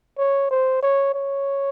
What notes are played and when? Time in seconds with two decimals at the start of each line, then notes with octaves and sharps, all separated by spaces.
0.18 C#5
0.51 C5
0.82 C#5
1.14 C#5